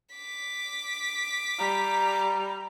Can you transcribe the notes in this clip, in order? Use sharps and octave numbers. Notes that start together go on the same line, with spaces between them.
D6 B6
G3 A#5